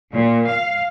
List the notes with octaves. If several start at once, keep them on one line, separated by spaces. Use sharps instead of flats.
A#2
F5